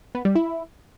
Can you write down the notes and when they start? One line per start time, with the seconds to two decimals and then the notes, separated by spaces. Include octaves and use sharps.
0.15 B3
0.25 G3
0.35 E4